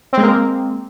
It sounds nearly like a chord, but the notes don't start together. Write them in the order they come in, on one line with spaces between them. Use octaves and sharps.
C4 G#3 A#3